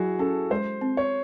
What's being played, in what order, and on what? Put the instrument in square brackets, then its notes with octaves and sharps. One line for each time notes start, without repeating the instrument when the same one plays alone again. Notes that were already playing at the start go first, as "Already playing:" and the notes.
Already playing: [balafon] F#3 [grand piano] E4 F#4 G#4
[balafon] C#4 [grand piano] A4
[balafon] G#3 [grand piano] C5
[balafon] C4
[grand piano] C#5